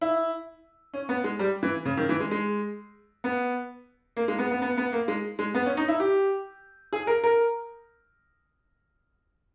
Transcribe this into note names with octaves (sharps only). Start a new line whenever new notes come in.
E4
C#4
B3
G#3
G3
E3
C#3
D#3
E3
G#3
G#3
B3
A#3
G#3
B3
B3
B3
B3
A#3
G#3
G#3
B3
C#4
D#4
E4
G4
G#4
A#4
A#4